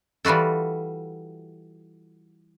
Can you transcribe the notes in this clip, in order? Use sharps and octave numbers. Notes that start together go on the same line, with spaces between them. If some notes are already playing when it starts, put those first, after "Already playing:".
E3 G3 F4 F#4 A4